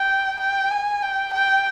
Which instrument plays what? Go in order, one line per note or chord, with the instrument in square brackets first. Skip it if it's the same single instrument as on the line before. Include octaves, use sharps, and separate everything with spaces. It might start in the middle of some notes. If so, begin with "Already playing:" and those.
Already playing: [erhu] G5
G5
G#5
G5
G5